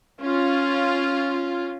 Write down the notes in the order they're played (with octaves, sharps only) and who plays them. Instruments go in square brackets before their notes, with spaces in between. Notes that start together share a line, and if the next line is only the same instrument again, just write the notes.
[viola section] C#4 F4